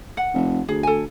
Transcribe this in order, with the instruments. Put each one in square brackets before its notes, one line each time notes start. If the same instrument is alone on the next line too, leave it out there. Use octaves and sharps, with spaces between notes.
[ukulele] F#5
[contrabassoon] F1
[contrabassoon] D2 [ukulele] G#4
[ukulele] A4 G#5